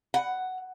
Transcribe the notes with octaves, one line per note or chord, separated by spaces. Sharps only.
F#5